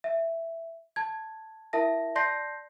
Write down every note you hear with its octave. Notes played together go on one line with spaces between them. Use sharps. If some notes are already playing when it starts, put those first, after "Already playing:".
E5
A5 G#6
E4 A#4 E5 A5 A#6
D5 A5 C6 G6 A#6 C7